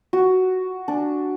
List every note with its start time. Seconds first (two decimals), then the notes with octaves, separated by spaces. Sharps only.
0.13 F#4
0.88 D4